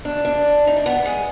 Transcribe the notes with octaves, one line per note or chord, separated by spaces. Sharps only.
D4
D4
D#4
D4
B3
G#3